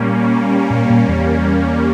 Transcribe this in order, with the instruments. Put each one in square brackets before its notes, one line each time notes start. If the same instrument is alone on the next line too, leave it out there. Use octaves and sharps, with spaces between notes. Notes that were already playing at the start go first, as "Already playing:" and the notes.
Already playing: [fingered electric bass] A#2 [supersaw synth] G3 A#3 C#4
[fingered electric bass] A#2
A#2
E2